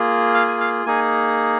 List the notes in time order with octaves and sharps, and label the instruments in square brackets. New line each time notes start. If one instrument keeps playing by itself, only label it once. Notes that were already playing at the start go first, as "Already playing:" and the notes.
Already playing: [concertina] A#3 F4 G#4
F5
G#5
F5
A#3 D#4 G#4 G#5